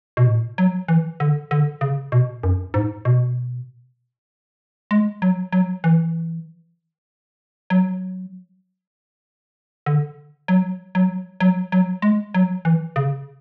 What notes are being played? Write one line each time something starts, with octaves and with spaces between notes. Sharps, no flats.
B2
A2
F#3
E3
D3
D3
C#3
B2
F#2
G#2
B2
G#3
F#3
F#3
E3
F#3
D3
F#3
F#3
F#3
F#3
G#3
F#3
E3
C#3